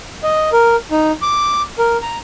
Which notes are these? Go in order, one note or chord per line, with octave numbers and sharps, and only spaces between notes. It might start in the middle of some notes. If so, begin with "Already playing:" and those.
D#5
A#4
D#4
D6
A#4
A#5